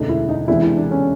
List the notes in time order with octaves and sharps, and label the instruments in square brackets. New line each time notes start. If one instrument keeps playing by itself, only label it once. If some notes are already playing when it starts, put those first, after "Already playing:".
Already playing: [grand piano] E1 D2 C#3 [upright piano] D4 D#4
[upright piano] E4
D#4
[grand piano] C3 E3 G#3 B3 D4 [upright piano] E4
[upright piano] E4
D4
C#4